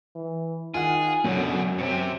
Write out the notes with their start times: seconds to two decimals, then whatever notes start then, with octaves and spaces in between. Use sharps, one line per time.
0.15 E3
0.74 D#3 F4 G#4 F#5
1.24 C#2 F#2 B2 D3 C#4
1.79 A2 C3 C4